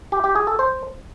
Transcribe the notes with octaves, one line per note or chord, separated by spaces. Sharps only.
G4
G4
G#4
A4
C5